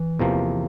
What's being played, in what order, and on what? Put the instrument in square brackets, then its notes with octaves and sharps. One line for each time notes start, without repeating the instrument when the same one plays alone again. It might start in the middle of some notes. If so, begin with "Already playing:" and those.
Already playing: [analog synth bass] E3
[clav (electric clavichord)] E2 C3 F3 A#3